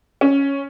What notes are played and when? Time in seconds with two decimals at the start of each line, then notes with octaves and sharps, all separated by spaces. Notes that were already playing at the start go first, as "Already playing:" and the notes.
0.21 C#4